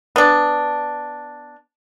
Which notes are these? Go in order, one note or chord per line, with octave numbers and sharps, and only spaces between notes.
B3 D4